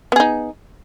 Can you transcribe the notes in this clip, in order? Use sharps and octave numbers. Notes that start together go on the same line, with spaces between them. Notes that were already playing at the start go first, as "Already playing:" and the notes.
B3 D#4 G#4